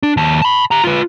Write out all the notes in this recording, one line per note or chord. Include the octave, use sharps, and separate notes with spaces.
D4
D#2 A5
A5 B5
G4 A#5
F4 B4